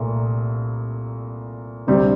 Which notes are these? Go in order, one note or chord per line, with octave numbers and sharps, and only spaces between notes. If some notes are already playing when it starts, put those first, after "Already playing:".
Already playing: C2 A#2 A3
D2 C3 G3 C4